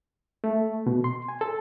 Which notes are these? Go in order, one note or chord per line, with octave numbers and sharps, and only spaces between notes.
A3
B2
C6
G#5
A4